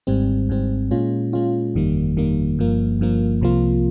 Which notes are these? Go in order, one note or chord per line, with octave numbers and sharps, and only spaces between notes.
G#1 G#2 G3 C4
G#1 G#2 G3 C4
A#2 G#3 C#4 F4
A#2 G#3 C#4 F4
G1 F2 D#3 G3 A#3
G1 F2 D#3 G3 A#3
G1 G2 F3 A#3
G1 G2 F3 A#3
C2 C3 F3 A#3 F4